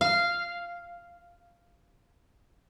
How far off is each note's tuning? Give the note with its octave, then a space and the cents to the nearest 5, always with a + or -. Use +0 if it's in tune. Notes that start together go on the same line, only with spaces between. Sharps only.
F5 -10